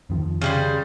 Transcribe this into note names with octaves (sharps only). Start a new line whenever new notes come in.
F2 D#3 F3
C#3 G3 C5